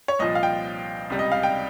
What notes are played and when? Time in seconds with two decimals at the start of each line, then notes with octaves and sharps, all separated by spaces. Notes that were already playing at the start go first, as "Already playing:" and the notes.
0.08 C#5
0.19 C2 A#2 F3 D#5
0.35 F5
0.43 G5
1.10 C#2 C3 G3
1.19 D#5
1.32 F5
1.43 G5